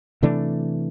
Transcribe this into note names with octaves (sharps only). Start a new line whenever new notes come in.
C3 E3 A3 D4